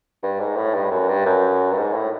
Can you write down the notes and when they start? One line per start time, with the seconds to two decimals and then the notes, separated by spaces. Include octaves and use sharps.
0.23 G2
0.40 G#2
0.57 A2
0.74 G2
0.91 F#2
1.09 G2
1.26 F#2
1.72 G2
1.78 G#2
1.94 A2